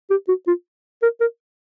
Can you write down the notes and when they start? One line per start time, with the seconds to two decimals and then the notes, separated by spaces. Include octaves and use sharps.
0.10 G4
0.28 F#4
0.47 F4
1.02 A#4
1.21 A#4